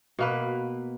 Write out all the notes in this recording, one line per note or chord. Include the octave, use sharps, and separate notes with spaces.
B2 A#3 B4